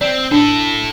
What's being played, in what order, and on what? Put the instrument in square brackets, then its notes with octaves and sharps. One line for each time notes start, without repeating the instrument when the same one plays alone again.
[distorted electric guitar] C4 [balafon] D5
[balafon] D4 [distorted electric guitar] E4 A4